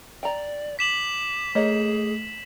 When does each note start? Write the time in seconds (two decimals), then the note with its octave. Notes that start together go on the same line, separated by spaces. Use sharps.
0.23 D5 G5 A#5
0.79 D6 B6 E7 F#7
1.55 A3 A#3 G#4 C#5 D#5